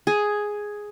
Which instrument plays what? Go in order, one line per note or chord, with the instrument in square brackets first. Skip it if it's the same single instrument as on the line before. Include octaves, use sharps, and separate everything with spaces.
[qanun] G#4